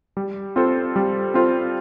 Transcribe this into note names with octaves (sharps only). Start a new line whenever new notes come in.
G3
C4 F4 A4 C5
G3
C4 F4 A4 C5